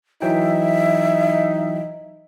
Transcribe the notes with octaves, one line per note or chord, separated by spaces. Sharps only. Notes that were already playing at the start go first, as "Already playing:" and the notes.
E3 F#3 D#4 E5 G5